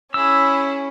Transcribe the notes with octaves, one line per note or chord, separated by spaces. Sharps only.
C#4 E4 G#4 E6